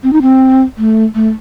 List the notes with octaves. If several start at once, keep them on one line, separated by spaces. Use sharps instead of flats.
C4
D#4
C4
A3
A3